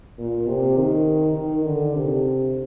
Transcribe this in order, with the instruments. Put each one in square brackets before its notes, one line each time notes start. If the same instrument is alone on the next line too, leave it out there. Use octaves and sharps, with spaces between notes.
[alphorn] A#2
C3
D#3
D#3
D3
C3